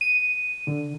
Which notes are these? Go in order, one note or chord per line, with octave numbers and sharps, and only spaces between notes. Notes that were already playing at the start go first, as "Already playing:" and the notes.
D#7
D3